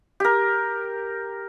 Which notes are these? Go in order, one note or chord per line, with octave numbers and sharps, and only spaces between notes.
G4 A#4